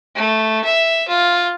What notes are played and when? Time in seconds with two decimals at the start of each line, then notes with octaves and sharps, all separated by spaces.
0.15 A3
0.64 E5
1.08 F4